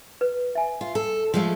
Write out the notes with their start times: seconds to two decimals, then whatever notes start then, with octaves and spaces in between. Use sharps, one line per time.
0.21 B4
0.55 E5 G#5
0.81 F4
0.95 A4
1.34 F3 G#3 A3